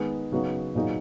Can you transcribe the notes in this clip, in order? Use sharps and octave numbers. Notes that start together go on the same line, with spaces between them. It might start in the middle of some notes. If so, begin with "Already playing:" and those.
Already playing: D#3 G#3 B3
C#3 F#3 B3 D#4
A#2 F#3 B3 D#4 G#4